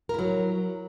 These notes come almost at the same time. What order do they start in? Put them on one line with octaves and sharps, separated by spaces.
A#4 E4 F#3